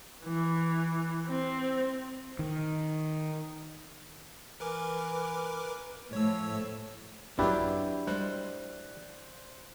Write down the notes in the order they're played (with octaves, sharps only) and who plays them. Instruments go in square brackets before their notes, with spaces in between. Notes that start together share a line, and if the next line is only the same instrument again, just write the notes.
[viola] E3
C4
[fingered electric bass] D#3
[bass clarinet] E3 [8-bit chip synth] A#4 B4 D6
[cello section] A2 [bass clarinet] F3 [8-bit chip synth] C#5 E6
[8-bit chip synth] G#1 F#2 F#3 [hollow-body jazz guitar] D4 [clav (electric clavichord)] E4 G4 B4 [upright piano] F#4
[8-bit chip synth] G3 G#3 [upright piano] C5 D5 F#6